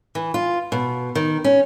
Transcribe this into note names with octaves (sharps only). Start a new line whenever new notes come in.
E3
F4
B2
D#3
C#4